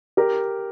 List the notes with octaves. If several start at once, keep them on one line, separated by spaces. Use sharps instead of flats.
G4 A#4